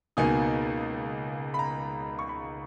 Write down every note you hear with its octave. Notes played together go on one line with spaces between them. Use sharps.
C#2 B2 A#3 D#4 G#5
B5
A#5
C#6
B5